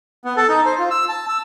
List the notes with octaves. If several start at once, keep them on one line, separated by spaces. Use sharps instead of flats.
B3
A4
D#4
C5
F4
E6
A5
E6